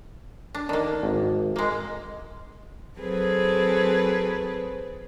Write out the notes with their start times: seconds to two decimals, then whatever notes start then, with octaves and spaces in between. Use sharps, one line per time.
0.55 D4
0.69 D#3 A#3 D4
1.03 G#1
1.56 G#3 A#3
3.00 F#3 C4 G#4 A4 B4 C5